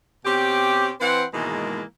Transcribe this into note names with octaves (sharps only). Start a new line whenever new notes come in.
B2 C4 C#4 G4
E3 C4 B4 C5 F#5
G#2 B2 D#3 E3 G#3 A#3